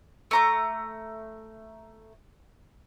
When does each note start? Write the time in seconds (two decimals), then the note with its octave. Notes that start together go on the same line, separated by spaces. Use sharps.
0.31 A3 A#5 D6